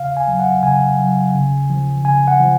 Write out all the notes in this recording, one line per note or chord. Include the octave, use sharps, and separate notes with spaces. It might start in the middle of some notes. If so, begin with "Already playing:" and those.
Already playing: C#3 F5
G#5
F#3
F#5
C#3 G#5
F#3
C#3
F3
C#3 G#5
F#5
F3